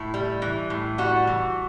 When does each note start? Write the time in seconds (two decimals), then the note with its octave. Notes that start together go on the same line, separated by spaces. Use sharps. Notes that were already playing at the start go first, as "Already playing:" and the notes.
Already playing: A2 E4
0.14 G3
0.42 E3
0.70 A2
0.98 G3 F#4
1.27 E3